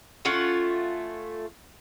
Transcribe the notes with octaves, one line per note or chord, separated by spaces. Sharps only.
A3 C#4 F4 F#5